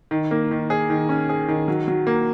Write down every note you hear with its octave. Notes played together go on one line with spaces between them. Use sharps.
D#3
A#3
D#3
G#4
D#3
C#4
G#4
D#3
F#3
F#3
A#3